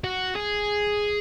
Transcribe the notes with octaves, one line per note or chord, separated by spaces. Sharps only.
F#4
G#4